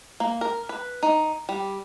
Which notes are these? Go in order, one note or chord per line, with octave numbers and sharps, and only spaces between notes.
A#3
A#4
B4
D#4
G3